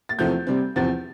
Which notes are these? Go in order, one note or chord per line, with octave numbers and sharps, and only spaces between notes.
A6
E2 C3 F3 A3 C4 G6
C3 G3 C4
E2 C3 F3 C4 A6